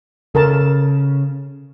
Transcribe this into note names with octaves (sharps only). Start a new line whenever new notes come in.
C#3 A4 A#4 A5